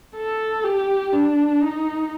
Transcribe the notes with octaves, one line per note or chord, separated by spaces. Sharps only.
A4
G4
D4
D#4